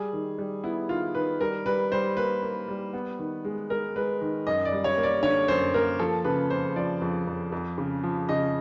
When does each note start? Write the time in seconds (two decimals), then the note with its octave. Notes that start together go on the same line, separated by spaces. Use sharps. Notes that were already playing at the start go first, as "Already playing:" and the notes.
Already playing: G3 G#4
0.13 D#3
0.38 G3
0.64 B3 E4
0.89 D#3 F4
1.15 D#3 B4
1.40 G3 A#4
1.66 G3 B4
1.91 G3 C5
2.17 A#3 B4
2.42 A#3
2.68 G3
2.93 B3
3.19 D#3
3.44 G#3
3.70 G#3 A#4
3.96 G#3 B4
4.21 D#3
4.47 F#2 D#5
4.65 D5
4.72 G3
4.84 C#5
4.97 A#3
5.03 D5
5.23 D3 C#5
5.48 F#2 C5
5.74 A#3 A#4
5.99 F3 A4
6.25 C#3 B4
6.50 F2 C5
6.76 F3 D5
7.01 F2
7.27 F2
7.52 F2
7.78 C#3
8.03 F3
8.29 C#3 D#5